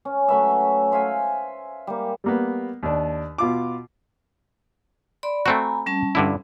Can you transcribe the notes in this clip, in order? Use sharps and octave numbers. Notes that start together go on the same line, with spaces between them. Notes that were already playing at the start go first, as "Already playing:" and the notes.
C#4
F#3 A3 B4 E5
C5 E5 F5 G#5
G3 A#3
G3 A#3 B3
D#2 D4
B2 F4 D6
D5 B5 C6
A3 C4 F#4 G#5 A#5 B5
G3 C#4 A5
G2 D3 E4